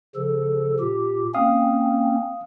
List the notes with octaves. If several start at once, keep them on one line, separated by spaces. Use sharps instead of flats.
C#3 F3 A4
A#2 G4
A#3 C4 C#4 F5 D#6